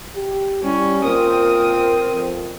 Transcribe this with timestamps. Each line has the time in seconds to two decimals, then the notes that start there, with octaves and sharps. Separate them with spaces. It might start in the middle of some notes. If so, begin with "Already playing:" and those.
0.16 G4
0.63 G3 C#4 E4
1.03 A#2 C4 A#4 D#6
2.12 F2